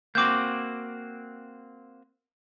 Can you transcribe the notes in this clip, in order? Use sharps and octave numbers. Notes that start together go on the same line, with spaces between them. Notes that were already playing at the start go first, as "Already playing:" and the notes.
A#3 C4 F#4 D6 G6